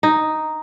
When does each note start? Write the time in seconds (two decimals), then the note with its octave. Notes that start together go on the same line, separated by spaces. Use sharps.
0.03 D#4